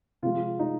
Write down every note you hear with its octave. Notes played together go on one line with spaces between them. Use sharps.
C3 F3 G#3 F4
D#4